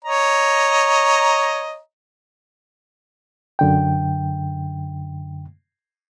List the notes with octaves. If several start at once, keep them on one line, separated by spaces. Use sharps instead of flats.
C#5 D#5 A#5
F#2 D3 G5